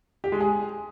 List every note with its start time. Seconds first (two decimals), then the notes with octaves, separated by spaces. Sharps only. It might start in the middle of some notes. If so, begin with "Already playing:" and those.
0.24 G4
0.32 G#3
0.40 G#4